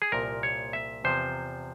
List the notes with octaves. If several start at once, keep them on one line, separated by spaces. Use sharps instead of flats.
G#4
C2 A#2 F3 A#4
C#5
E5
E2 C3 F3 C5